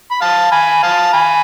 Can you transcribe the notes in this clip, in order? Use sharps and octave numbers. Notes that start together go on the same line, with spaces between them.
B5
F5 A5
G#5 B5
F5 A5
G#5 B5